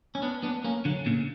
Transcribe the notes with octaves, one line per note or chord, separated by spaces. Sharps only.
C#4
B3 D4
B3 D4
A#3 C#4
D3 F#3
A#2 C#3